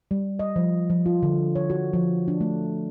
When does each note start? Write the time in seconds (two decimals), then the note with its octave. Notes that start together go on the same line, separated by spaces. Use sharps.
0.11 G3
0.39 D#5
0.56 F3
0.90 F3
1.06 F4
1.23 D3
1.55 C#5
1.70 F#4
1.93 F3
2.28 D4
2.41 A3